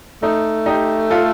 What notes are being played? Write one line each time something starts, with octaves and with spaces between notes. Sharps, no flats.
A3 D#4
D#4 G4
F4 A4